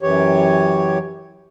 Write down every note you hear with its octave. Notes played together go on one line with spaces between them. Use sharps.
F#2 E3 G4 C#5